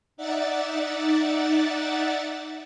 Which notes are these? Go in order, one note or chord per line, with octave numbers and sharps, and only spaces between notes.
D#4 D5 E5 F#5 A6